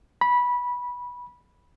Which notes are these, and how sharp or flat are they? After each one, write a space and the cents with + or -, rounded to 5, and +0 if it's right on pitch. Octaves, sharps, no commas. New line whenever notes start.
B5 -15